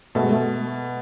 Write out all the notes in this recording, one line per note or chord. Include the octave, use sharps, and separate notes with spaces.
B2 A3
G#3
A3